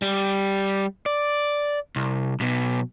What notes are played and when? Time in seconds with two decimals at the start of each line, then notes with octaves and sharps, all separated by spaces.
0.02 G3
1.06 D5
1.96 C2
2.40 B1 B2